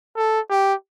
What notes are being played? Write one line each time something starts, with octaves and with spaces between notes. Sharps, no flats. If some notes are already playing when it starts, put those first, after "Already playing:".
A4
G4